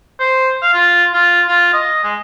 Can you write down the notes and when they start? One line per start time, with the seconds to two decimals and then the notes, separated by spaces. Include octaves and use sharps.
0.20 C5
0.62 F5
0.74 F4
1.13 F4
1.48 F4
1.73 D#5
2.04 G#3